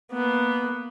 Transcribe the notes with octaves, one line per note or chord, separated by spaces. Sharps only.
A#3 B3